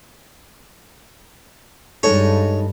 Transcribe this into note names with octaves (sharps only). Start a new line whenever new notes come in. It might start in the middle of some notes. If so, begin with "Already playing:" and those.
G2 G#3 D#4 A4 C#5 C#6